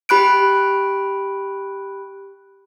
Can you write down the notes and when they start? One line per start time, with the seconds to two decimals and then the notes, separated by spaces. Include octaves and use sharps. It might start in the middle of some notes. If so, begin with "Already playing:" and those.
0.09 G4 B5 F#6 D7